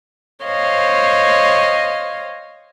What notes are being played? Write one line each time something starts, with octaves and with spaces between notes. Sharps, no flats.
C5 C#5 D#5 F5